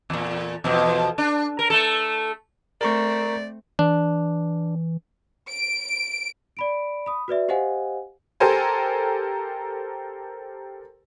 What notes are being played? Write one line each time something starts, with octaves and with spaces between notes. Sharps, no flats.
E2 A#2
E2 B2 F3
D4
A#4
A3 A4
A3 C4 A#4 D5 A#5 C#6
E3 D4
D7
D5 B5 D7
B5 D#6
F#4 B4 D5 E5
G4 C5 D#5 F5 F#5 G#5
G4 A4 A#4 C5 G#5